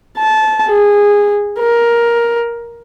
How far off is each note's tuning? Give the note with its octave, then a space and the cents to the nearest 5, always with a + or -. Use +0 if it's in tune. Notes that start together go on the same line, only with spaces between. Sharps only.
A5 -20
G#4 -15
A#4 +10